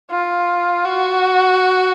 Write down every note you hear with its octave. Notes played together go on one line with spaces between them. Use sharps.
F4
F#4